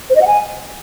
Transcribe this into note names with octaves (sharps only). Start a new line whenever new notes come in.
C5
D#5
F#5
G#5